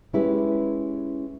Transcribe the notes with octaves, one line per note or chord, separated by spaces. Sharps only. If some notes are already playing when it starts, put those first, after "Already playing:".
G#3 C#4 E4 G4 B4